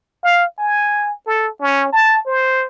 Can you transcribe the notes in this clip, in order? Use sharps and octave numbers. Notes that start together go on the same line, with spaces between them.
F5
G#5
A4
C#4
A5
C5